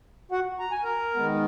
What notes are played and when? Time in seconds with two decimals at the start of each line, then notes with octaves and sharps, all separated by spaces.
0.31 F#4 F#5
0.60 A#5
0.72 G#5
0.83 A#4 A#5
1.14 D#3 G#3 B3